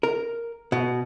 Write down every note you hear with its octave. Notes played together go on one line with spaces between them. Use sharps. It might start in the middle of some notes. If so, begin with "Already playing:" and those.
A#4
B2